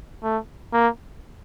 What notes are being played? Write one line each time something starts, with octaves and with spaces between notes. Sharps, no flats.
A3
A#3